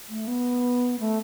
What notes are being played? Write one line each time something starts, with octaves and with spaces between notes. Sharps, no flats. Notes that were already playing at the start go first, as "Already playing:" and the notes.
A3
B3
A3